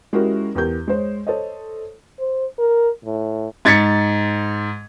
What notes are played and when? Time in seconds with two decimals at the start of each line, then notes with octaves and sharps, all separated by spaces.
0.13 G#3 C#4 E4 F#4 G4 A#4
0.55 E2 G4 A#4 G6
0.88 G#3 C5 C#5
1.27 A4 C5 C#5 D#5
2.19 C5
2.59 A#4
3.05 A2
3.65 G#2 G#6 A6 B6 C#7